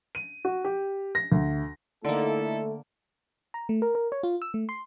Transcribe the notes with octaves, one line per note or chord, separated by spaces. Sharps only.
D#7
F#4
G4
A#6
D2
D3 A3 A#3 D#4 E4 A4
A#5
A3
A#4
A#4
C#5
F4
E6
A3
C6